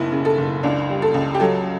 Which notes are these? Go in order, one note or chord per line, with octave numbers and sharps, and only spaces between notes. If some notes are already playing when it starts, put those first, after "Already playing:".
Already playing: F#1 B1 E4
C#3
A4
F#1
C#2 D4
G3
A4
C#2
G4
F#3 A4